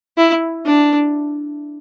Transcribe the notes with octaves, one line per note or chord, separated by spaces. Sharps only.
E4
D4